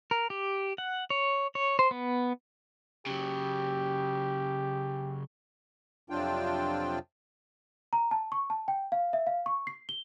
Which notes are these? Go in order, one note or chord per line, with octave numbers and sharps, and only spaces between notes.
A#4
G4
F#5
C#5
C#5
C5
B3
C#3 F#3 G4
F2 C3 F#3 D4 F4 G5
A#5
A5
C#6
A5
G5
F5
E5
F5
C#6
C7
G7